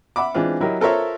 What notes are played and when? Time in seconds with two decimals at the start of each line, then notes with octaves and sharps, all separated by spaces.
0.16 E5 F#5 B5 D6
0.34 E3 G#3 C4 D4 F4
0.60 F#3 E4 G4 A#4 D#5
0.81 F4 A4 A#4 C5 C#5 E5